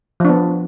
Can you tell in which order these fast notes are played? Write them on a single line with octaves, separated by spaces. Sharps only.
F3 D4 B3